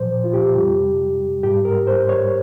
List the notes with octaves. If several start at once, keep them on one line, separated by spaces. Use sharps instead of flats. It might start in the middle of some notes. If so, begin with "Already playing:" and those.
Already playing: A#2 F3 C5
F4
G4
F2 C3 G3
G#2 G3 G4
A#4
C5
C#5